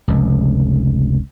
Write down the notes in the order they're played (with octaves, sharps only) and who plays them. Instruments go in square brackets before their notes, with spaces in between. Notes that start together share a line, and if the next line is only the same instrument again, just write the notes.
[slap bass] F1 C#2